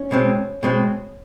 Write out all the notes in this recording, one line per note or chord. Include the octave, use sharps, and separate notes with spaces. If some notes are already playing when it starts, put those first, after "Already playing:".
Already playing: C#4
B2 G#3 C4
B2 G#3 C4